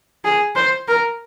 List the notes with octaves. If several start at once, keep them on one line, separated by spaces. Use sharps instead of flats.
G#4
C5
A#4